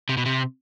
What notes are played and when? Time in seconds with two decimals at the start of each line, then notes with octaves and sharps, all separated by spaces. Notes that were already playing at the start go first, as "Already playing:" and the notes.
0.09 C3
0.17 B2
0.26 C3